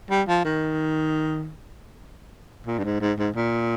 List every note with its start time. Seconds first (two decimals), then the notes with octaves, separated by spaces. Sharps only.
0.10 G3
0.28 F3
0.45 D#3
2.67 A#2
2.79 G2
2.84 G#2
3.01 G#2
3.18 G#2
3.35 A#2